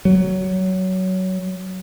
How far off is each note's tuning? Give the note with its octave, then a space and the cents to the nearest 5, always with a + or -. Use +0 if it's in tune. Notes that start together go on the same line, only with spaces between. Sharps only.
F#3 +15